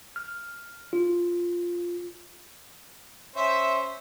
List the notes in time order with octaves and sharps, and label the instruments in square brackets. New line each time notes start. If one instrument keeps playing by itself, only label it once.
[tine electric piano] F6
F4
[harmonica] C#4 C5 [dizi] E5